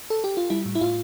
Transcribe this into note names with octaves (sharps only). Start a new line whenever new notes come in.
A4
G4
F4
G3 E4
A2
E4
A2 F4